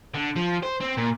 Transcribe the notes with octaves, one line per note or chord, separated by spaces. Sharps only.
D3
F3
C5
C4
A#2